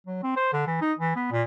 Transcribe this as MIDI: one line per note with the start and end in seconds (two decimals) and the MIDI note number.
0.07 0.19 54
0.23 0.33 60
0.36 0.49 72
0.53 0.63 50
0.67 0.76 52
0.81 0.93 63
0.99 1.15 52
1.16 1.28 59
1.31 1.43 46